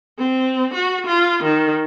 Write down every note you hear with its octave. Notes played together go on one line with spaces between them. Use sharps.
C4
F#4
F4
D#3